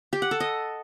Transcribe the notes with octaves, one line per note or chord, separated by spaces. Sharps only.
G4
F#5
A4
D#5